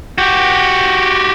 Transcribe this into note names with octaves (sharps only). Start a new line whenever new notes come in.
F#4 G4